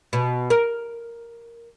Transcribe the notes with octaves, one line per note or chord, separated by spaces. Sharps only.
B2
A#4